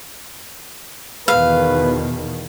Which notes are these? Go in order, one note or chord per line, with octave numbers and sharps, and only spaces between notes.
E2 B2 D#3 B4 F5